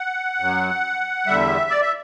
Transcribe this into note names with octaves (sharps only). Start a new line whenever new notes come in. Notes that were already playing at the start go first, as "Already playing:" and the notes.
Already playing: F#5
F#2 F#3
E2 D3 G3 E5
D5
E5